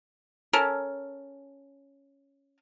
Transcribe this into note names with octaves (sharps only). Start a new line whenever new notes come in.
C#4 A4 A#4